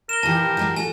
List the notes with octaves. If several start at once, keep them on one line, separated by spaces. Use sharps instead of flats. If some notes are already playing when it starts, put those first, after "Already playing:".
A#4 E7 G7
A#2 E3 G4 A5
F#3 G#3 F#4
F#4 G4 A4 G#5